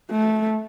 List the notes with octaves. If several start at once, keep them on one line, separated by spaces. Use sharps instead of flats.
A3